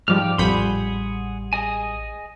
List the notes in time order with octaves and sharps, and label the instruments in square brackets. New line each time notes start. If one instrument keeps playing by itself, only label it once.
[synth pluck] G#2 F3 G3 [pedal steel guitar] G5 D6 F6
[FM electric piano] A1 G3 [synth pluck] F2 B5 G6 [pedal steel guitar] G#4 F#5 C6
[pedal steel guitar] G#4 D#5 G#5